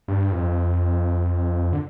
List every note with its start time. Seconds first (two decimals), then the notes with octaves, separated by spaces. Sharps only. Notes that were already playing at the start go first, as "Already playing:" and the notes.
0.08 G2
0.32 F2
1.73 D3